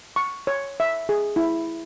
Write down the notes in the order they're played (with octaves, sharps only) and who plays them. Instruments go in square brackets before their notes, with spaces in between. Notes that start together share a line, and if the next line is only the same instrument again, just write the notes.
[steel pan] C#6
C#5
E5
G#4
E4